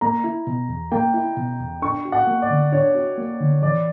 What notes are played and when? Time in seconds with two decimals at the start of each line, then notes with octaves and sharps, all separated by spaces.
0.01 A#3 A#5
0.24 E4
0.47 B2
0.69 E2
0.92 A#3 G5
1.14 E4
1.37 B2
1.60 E2
1.82 D4 C#6
2.05 F#4
2.12 F#5
2.27 A#3
2.42 D5
2.50 D3
2.72 D4 C#5
2.95 F#4
3.18 A#3
3.40 D3
3.62 E3 D5